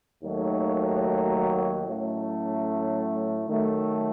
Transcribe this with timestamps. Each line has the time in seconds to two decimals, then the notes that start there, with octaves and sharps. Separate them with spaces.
0.22 D#2 D#3 F#3 A3
1.85 A2 F#3 A3 C#4
3.49 D#3 F#3 A3